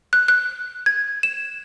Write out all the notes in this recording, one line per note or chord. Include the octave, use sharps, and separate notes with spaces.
F#6
F#6
G#6
E7